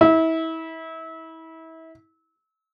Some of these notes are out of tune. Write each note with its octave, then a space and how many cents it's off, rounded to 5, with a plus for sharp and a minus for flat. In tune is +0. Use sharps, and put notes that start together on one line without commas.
E4 -30